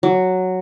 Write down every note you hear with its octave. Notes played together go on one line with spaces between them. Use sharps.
F#3